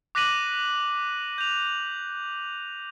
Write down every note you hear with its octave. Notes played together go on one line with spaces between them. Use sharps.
D6 F#6 A#6 B6 D#7 F#7
G6 F7